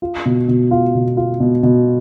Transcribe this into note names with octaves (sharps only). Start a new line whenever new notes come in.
F4
B2
B2
F4
B2
F4
B2
B2